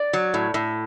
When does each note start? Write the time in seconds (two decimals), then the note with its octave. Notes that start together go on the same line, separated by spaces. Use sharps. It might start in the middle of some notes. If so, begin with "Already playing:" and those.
Already playing: D5
0.13 F#3
0.34 A2
0.54 A2